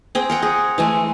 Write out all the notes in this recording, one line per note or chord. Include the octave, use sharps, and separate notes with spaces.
C4 G#4 G5
A#4 F#5 G5
G#4
E3 G#3 A3